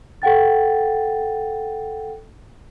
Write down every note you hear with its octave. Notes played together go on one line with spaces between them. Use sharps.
A4 F#5 G5 A6